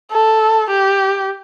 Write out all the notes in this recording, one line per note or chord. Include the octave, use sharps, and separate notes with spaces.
A4
G4